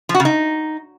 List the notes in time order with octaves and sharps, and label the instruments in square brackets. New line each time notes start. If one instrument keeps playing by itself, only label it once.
[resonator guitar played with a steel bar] F3
F#4
C#3
D#4